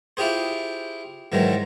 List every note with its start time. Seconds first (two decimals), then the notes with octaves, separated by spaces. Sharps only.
0.17 E4 F4 G4 G#4 C5
1.32 G#2 D#3 E3 F#3 G#3